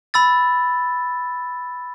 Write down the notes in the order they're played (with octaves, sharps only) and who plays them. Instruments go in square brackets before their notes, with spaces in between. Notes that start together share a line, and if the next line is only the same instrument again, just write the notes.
[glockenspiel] B5 E6 A6